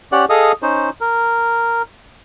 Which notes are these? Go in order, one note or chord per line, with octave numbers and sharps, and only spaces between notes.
C#4 G4 D5 F#5
G#4 A4 D#5 F5 D#6
C#4 D#4 C5
A#4